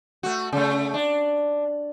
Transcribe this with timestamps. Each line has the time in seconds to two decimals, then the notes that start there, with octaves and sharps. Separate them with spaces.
0.23 A3 F#4
0.53 C#3 A3
0.94 D4